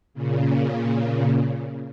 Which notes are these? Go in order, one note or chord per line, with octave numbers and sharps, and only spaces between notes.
A#2 C#3